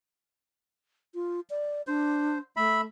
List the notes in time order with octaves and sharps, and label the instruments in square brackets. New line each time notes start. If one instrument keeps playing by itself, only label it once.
[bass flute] F4
D5
[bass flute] D4 [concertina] C5
[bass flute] A3 [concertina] E5 B5